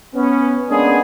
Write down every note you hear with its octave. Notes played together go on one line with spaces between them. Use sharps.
B3 C#4
G#3 A#3 B3 C#4 D4 G#4